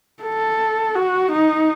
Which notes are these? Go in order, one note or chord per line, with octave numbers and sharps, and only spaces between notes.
A4
F#4
D#4